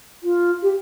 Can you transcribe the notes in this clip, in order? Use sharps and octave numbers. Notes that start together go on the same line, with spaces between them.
F4
G4